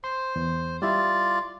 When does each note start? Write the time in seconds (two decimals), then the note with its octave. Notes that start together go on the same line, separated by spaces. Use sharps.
0.04 C5 C6
0.36 E2
0.82 G3 E4 F4 D5 E5